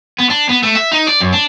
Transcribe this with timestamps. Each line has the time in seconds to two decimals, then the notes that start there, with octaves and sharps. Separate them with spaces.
0.19 B3
0.30 D4
0.49 B3
0.63 A3
0.75 E5
0.92 D#4
1.07 D5
1.21 F#2
1.33 D4